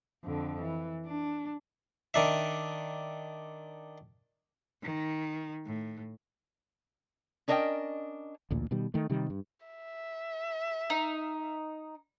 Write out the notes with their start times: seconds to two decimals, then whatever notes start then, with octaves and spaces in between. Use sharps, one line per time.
0.24 F2 D3
0.61 E3
1.06 D4
2.14 D#3 D4 E5
4.82 D#3
5.66 A2
7.48 C#4 D4 A#4 D#5 F#5 G5
8.51 A1 D2 A#2
8.71 B2 D#3 G3
8.94 D#3 A3
9.10 C3 D#3 G3
9.30 G2
9.66 E5
10.90 D#4